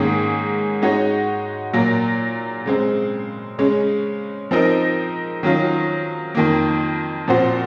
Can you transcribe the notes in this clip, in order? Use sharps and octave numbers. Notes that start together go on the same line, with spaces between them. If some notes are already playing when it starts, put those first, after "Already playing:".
Already playing: G#2 D#3 A#3 C#4 G#4
G#3 D#4 F#4 C#5
A#2 F#3 A#3
C#3 G#3 C4
C#3 G#3 C#4
F3 C4 D#4 A#4
D#3 F#3 C#4 F4
F2 D#3 A#3
A#2 F3 C4 F#4 C5